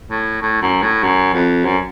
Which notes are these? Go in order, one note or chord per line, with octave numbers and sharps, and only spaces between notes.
A2
A2
F#2
A2
F#2
F2
F#2